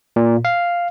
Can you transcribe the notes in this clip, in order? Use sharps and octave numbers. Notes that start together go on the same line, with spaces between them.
A#2
F5